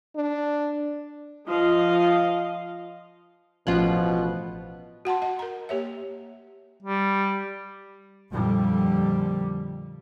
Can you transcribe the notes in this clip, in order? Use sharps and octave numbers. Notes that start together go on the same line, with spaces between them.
D4
F3 D#5 F5
A1 B2 F3 C#4 F4 F#6
F#4 F#5 A5 C6
D#5 F#5
A#4 A#5
A#3 G4 C#5 E5
G3
F2 A#2 D3 G3